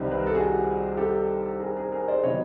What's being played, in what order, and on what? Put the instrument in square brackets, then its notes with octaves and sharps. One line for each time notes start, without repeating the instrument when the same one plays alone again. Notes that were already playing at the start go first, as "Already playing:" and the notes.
Already playing: [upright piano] C2 C3 D#3 G3 C4
B4
A#4
A4
F#4 G#4
G4 A4
G#4 A#4
G#4 A#4
G#4 A#4
C5 D5
C3 D#3 F#3 B3 C#5 D#5